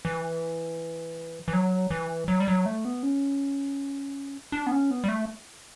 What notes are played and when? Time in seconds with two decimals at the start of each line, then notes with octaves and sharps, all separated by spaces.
0.05 E3
1.48 E3
1.53 F#3
1.91 E3
2.28 F#3
2.40 G3
2.48 F#3
2.66 A3
2.85 B3
3.03 C#4
4.52 D4
4.67 B3
4.72 C#4
4.91 B3
5.04 G3
5.09 A3